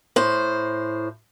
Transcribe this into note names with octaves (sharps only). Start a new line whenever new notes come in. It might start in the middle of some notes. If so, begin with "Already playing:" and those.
A2 C5